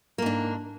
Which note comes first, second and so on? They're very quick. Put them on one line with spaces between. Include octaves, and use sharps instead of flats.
A#3 G#2 D4